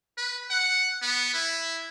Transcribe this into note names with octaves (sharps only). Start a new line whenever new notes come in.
B4
F#5
B3
E4